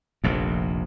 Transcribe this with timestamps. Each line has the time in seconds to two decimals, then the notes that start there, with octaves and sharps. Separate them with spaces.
0.24 F1 A#1 F2